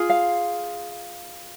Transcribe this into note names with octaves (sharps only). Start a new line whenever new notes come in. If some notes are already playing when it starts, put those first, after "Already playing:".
Already playing: F4 G#4
F5